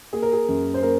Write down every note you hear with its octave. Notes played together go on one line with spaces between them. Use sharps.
A#3 G#4
A#4
G#4
F#2
C5
A#3 A#4